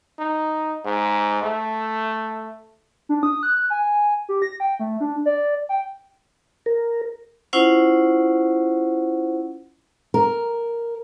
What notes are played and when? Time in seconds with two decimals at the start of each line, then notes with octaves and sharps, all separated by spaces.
0.19 D#4
0.85 G#2
1.43 A3
3.09 D4
3.23 D#6
3.43 F#6
3.70 G#5
4.29 G4
4.42 A#6
4.60 G5
4.79 A3
5.00 D4
5.26 D5
5.69 G5
6.66 A#4
7.53 C#4 E4 F4 C5 F#5
10.14 A#4